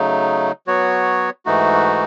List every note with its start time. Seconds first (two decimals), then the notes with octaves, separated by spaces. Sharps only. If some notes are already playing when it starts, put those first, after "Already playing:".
Already playing: C#3 F#3 A3 D#4
0.67 F#3 B3 F#4 C#5
1.46 G#2 E3 A3 D#4 F#4